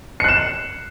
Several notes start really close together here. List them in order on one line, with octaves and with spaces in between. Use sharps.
C#7 F#6 E7